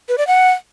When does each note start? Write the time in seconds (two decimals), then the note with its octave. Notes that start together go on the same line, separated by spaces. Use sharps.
0.08 B4
0.18 D5
0.27 F#5